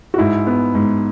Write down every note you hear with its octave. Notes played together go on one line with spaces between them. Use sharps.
F#4
G#2 E4
B3
G#2